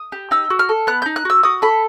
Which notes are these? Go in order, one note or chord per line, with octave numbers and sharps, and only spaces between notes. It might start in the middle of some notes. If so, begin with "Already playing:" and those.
Already playing: D#6
G4
D#4 E6
F#4
F6
A4
B3 F#6
D#4 G6
F#6
F#4 E6
F#4 D#6
A4 B5